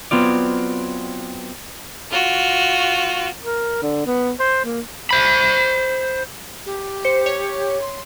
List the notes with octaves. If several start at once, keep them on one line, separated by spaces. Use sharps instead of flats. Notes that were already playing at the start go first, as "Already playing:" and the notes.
F#3 B3 C4 F4 D5
F4 F#4
A#4
D3
B3
C5
A#3
C5 B5
G4
C5 C#7
C#5
C6